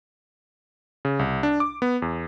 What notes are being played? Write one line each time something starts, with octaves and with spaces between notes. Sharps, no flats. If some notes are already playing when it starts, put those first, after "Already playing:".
C#3
C2
D4
D6
B3
E2